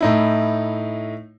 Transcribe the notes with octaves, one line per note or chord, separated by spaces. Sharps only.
A2 D#4 E4